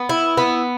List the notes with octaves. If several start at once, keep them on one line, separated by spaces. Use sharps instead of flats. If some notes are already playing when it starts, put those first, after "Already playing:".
Already playing: B3
E4
B3